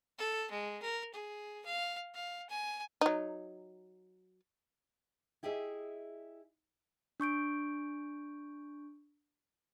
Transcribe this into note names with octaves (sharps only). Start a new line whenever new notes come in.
A4
G#3
A#4
G#4
F5
F5
G#5
F#3 D#4
E4 G4 G#4 D#5 E5
D4 C#6 G6 D7